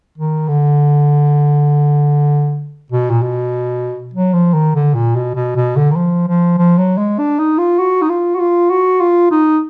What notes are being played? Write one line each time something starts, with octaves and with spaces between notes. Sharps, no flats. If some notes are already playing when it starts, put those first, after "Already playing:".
D#3
D3
B2
A#2
B2
F#3
F3
D#3
D3
A#2
B2
B2
B2
D3
D#3
F3
F3
F3
F#3
G#3
D4
D#4
F4
F#4
D#4
F4
F#4
F4
F#4
F4
D#4